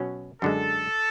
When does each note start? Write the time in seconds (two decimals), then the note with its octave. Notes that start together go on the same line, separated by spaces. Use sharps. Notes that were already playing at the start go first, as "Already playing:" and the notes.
Already playing: B2 F#3 C#4
0.42 F#2 D3 G#3 A4